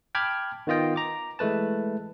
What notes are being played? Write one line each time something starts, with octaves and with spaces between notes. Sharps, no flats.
G5 A5 B5 D6 F6 G#6
D#3 B3 F4 D#5 G5
A#5 D6
E3 G#3 A3 B4 A5